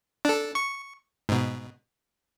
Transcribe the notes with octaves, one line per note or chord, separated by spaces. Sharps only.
D4 A4
C#6
G#2 B2